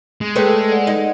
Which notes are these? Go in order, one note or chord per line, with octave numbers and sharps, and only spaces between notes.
G#3
A3 G#4 B4 C#5 G5
D5 F#5
D#4